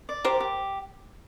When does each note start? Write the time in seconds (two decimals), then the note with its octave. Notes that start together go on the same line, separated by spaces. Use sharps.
0.09 D5
0.25 G4 A#4 C5
0.40 G4